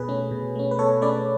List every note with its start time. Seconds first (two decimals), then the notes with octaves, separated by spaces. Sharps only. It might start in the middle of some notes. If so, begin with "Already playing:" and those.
Already playing: B2 G#4 B4
0.09 A3 C#4
0.31 B2
0.55 A3 C#4
0.71 B4
0.79 B2 A4 C#5
1.01 A3 C#4 B4 D5